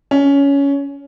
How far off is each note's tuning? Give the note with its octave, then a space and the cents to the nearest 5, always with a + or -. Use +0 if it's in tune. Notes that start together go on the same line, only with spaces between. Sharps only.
C#4 +15